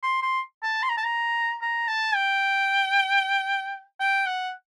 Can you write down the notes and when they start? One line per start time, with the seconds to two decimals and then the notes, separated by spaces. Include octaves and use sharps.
0.03 C6
0.22 C6
0.63 A5
0.83 C6
0.89 A#5
0.97 A5
1.04 A#5
1.62 A#5
1.88 A5
2.15 G5
4.00 G5
4.26 F#5